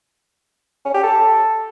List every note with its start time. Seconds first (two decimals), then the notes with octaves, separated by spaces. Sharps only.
0.85 C#4
0.94 G4
1.03 A4